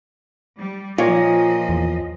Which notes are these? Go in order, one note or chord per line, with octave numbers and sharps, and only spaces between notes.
G3
A#2 F3 F4 C#5 D#5
E2